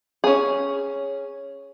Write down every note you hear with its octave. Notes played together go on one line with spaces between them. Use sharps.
C#4 G#4